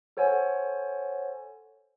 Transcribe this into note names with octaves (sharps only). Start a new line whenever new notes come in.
A4 C5 C#5 F#5 G#5